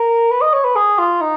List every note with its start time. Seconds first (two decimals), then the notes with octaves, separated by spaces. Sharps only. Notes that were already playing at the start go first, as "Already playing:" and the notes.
Already playing: A#4
0.31 B4
0.41 D#5
0.53 C#5
0.64 B4
0.75 G#4
0.99 F4
1.21 D#4